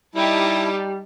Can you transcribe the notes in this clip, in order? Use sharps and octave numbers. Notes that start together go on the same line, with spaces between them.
G3 D#4 E4 G4 A5